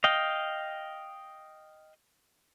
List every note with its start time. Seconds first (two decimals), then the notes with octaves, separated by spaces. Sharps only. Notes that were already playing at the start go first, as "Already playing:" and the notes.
0.04 D#5 F5 G5